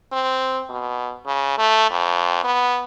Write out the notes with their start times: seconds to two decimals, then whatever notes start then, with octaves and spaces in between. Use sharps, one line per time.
0.12 C4
0.70 B2
1.26 C#3
1.58 A3
1.90 F2
2.44 B3